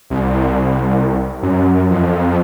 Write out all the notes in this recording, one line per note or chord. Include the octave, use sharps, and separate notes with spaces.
C2
F#2
F2